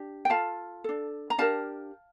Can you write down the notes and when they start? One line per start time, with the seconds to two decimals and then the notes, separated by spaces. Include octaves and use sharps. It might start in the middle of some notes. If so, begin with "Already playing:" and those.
Already playing: D4 G4
0.25 G5
0.30 F4 A4 F5 A5
0.84 D4 A4
1.30 A#5
1.38 D4 G4 A#4 F5 A5